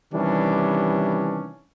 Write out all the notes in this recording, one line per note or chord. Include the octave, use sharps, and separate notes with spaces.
C3 D#3 E3 G3 C#4 D4